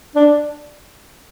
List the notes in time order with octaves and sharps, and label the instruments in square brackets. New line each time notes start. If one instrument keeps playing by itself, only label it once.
[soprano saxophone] D4